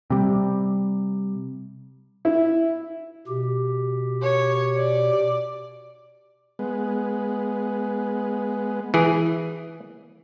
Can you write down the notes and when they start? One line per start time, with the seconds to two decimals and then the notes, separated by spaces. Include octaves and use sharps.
0.10 C3 G3
2.25 E4
3.27 B2 G4
4.23 C#5
4.78 D5
6.59 G#3 B3
8.94 E3 G#4